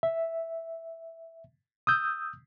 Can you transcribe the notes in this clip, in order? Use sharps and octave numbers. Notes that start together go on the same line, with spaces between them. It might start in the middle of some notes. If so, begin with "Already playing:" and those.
E5
D#6 E6 G6